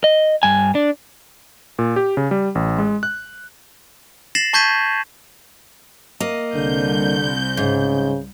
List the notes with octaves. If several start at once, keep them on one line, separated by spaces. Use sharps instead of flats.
D#5
G2 G#5
D4
A#2
G4
C#3
G3
A1
G#3
F#6
A6 A#6 C7 E7 F#7
A5 C#6 G6 G#6 B6 D#7
A#3 D#5
C2 D3 G6
G#2 C#3